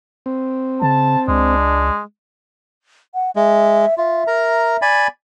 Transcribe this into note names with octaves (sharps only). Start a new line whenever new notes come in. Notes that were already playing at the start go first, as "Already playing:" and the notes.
C4
C#3 A5
C#2 G#3 D4
F#5
G#3 E5
F4 E5
A#4 A#5
D5 G#5 B5